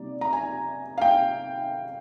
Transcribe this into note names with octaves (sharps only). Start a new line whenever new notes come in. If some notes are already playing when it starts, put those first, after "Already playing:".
Already playing: C3 G3 A#3 D#4 D5
A#5
G#5
F5
G5